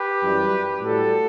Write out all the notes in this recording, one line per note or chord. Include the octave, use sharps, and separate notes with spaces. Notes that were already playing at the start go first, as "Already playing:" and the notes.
Already playing: G4 B4
F#2 E3 G3
A2 G3 F#4 A4